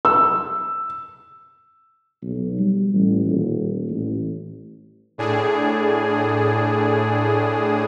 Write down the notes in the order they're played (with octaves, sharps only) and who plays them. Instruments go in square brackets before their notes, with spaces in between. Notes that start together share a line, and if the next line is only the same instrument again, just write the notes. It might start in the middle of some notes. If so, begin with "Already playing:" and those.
[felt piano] E6
[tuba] B1
G3
A1
D#1
A1
[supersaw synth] A2 D4 G#4